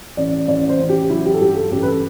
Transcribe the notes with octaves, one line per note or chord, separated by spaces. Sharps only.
A1 D5
A1 D5
C5
A1
G4
F#3 E4
G4
A4
G2 G4
A4
A1 G4
B4
A4